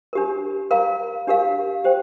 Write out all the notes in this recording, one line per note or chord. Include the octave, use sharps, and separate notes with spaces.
D4 G4 A#4
A#4 F5 A#5
D4 G4 A#4 F5
G4 C5 G5